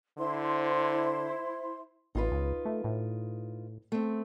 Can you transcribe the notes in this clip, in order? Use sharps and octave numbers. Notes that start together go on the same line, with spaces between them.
D3 E4 C5 C6
A1 D#4 F4 B4
C#2
A3
A2
A3 C4